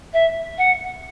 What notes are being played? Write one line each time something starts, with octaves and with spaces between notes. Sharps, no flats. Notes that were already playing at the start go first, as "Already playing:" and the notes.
E5
F#5